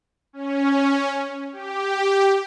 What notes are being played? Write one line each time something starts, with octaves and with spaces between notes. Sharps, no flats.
C#4
G4